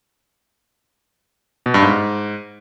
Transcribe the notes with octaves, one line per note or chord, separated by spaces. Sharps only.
B2
G2
G#2